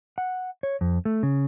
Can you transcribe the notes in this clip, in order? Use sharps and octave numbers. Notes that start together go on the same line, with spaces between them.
F#5
C#5
F2
A3
C#3